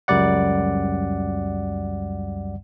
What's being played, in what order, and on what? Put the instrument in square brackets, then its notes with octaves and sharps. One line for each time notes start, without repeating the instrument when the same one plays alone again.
[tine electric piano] C#2 F#2 G3 D5 F#5